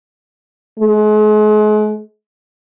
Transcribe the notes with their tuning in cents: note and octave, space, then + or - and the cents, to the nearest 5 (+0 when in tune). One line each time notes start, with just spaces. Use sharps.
G#3 +40